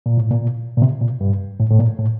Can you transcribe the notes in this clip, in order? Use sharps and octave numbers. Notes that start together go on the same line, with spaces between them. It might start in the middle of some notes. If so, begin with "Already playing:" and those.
A#2
A2
A#2
A#2
C3
A#2
G2
A2
A2
A#2
A2